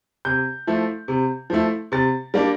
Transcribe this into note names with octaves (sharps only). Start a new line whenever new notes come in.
C3 G6
F3 A3 E4
C3
F3 A3 E4
C3 A6
G3 A#3 D4